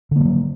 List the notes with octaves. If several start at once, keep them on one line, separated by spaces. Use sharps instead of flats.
D3 F#3 G3 A#3